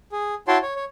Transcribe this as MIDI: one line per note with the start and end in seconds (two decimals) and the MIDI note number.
0.12 0.34 68
0.48 0.58 64
0.48 0.58 66
0.48 0.58 73
0.48 0.58 79
0.48 0.58 81
0.48 0.58 84
0.63 0.74 73
0.76 0.85 73